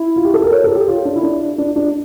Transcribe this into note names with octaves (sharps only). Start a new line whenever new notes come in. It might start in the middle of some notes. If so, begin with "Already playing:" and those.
Already playing: E4
F4
G4
A4
A#4
C#5
A4
G4
F4
D4
E4
D4
D4
D4